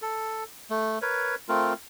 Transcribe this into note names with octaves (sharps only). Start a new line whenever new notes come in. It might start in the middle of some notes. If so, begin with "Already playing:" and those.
A4
A3
A#4 B4 C#5
A3 C4 F4 A#4